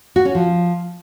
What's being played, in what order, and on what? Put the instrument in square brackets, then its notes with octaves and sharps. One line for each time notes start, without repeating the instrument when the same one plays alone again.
[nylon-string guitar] F#4
C#4
F3